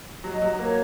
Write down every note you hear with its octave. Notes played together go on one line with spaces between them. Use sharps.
F#3 D#5
F#3
A#3 C#5